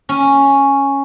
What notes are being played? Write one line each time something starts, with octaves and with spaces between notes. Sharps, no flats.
C#4